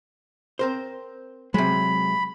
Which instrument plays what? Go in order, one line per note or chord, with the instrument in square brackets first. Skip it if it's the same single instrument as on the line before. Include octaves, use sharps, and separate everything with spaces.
[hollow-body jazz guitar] C4 A#4 C5
[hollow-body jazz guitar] C3 G#3 [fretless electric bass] F#3 [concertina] B5